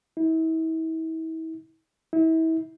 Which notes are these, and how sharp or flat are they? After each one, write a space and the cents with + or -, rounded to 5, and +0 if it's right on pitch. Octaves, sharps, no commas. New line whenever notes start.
E4 -40
E4 -35